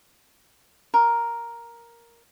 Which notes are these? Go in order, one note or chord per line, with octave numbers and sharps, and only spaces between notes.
A#4